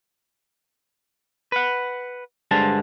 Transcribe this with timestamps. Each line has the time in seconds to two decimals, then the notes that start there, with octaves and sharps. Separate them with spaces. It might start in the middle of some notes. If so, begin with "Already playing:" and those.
1.52 B4 F#5
2.51 G2 D3 G#3 C5 A5